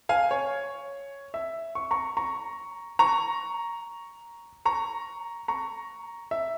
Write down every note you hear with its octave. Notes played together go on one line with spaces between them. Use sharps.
F5 G#5
C#5
E5
C#6
A#5 C#6
A#5 C#6
A#5 C#6
A#5 C#6
A#5 C#6
E5